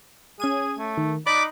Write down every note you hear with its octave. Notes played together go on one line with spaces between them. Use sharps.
C#4 G#4 G#6 D#7
A3
D#3
D#4 D5 B5 D6 F#6